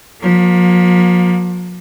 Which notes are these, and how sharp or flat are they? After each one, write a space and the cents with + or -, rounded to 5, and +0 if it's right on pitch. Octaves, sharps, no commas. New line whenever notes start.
F3 +40 A#3 +20